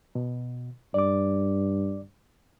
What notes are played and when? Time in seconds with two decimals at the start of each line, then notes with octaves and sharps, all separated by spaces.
0.15 B2
0.94 G2 D5 D6